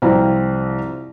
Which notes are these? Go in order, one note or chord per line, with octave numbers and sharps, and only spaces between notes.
C2 F3 C4 F5 A#5